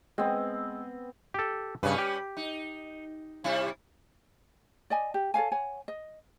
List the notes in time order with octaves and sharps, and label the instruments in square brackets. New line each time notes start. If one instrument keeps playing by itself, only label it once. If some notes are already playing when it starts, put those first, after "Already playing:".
[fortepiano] G#3 [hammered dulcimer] B3 C4
[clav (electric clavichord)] G4 A4
[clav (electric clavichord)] G2 C#3 [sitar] G3 C#4 B4
[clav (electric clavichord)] G4
[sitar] D#4
C3 G3 E4
[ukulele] D5 D#5 G#5
G4
A4 C#5 F5 G#5
C#5 F#5 G#5
D#5